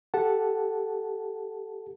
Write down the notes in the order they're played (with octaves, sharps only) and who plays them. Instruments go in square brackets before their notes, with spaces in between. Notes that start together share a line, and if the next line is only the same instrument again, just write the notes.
[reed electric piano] G4 A4 F#5 A5